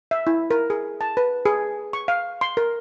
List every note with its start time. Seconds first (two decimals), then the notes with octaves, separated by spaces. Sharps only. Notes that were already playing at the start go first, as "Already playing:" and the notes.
0.11 E5
0.27 E4
0.51 A#4
0.70 G#4
1.01 A5
1.17 B4
1.45 G#4
1.93 C#6
2.08 F5
2.41 C6
2.57 A#4